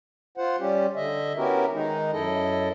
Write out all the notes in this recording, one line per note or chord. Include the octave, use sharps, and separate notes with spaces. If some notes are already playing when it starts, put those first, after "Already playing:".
F4 C5 F#5
G3 C#4 G4
D3 D#5 E5
B3 C#4 E4 F#4 G4 A#4
D#3 G#3 D#4
F#2 E4 A4 D#5